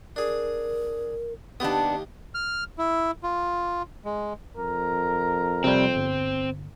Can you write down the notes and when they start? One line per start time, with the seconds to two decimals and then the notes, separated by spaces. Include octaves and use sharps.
0.16 D4 G#4 A#4
1.60 D#2 B3 D4 G4 D#6
2.35 F6
2.78 E4
3.23 F4
4.05 G#3
4.57 F2 A#4
5.64 C3 G3 C4
5.96 G1